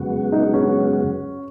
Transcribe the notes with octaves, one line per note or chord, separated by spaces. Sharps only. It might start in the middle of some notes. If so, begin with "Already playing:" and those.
Already playing: F#2 C#3 G#3 B3 F#4
D#4
C#4